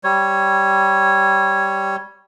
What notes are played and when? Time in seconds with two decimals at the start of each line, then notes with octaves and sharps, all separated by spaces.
0.04 G3 C#5